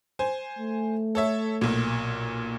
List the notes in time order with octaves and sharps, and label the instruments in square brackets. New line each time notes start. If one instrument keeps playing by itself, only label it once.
[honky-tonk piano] C5 G#5
[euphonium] A3
[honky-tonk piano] A4 C#5 E5
B1 A#2